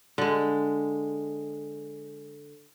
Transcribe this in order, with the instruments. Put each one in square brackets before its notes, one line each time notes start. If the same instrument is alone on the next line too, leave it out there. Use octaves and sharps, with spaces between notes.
[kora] D3 G#3